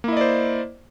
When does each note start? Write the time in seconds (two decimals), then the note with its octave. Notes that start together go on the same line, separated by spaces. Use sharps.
0.04 A#3
0.08 E4
0.12 D#5
0.17 D5
0.21 C5